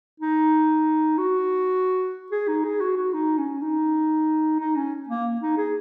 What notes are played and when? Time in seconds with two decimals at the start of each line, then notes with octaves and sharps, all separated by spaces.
0.20 D#4
1.18 F#4
2.32 G#4
2.48 D#4
2.64 G#4
2.81 F#4
2.97 F#4
3.13 D#4
3.38 C#4
3.62 D#4
4.60 D#4
4.76 C#4
5.09 A#3
5.41 D#4
5.57 G#4